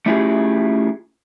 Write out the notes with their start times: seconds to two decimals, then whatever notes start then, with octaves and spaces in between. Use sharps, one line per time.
0.06 A3 C#4 E4 F4 G4 G#4